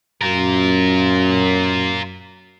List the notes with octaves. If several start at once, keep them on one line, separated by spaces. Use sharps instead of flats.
F#2 F4 A#4